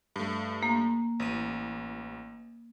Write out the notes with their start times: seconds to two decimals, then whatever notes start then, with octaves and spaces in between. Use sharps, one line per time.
0.16 G2 A3
0.63 A#3
1.20 A1 D#7